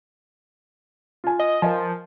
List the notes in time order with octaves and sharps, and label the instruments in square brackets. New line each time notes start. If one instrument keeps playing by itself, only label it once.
[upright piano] F4 G#5
[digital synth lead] D#5
[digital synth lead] F3 [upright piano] A#4 D#5 G#5